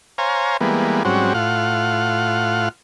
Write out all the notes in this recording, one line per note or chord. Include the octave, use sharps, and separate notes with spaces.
C5 C#5 F5 G#5 A#5
E3 G3 G#3 A#3 B3
G#2 F#3 G3 C4 C#4 F#4
A2 F4 F5 F#5